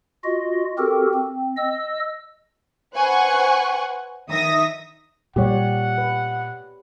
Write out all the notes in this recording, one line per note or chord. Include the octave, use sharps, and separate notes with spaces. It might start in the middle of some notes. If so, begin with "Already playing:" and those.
F4 F#4 D#5
C4 F#4 G4 A4 A#4
C4
D#5 E6
B4 C5 F#5 G#5 C#6 F#6
D#3 E5 D#6 A#6
A#2 G3 G4 C#5 D5 F#5
B4